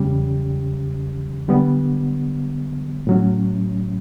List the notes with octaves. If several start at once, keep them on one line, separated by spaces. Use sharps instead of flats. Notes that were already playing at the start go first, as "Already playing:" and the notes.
Already playing: E2 C#3 G3 C#4 G4
D3 G3 B3
A2 F#3 C#4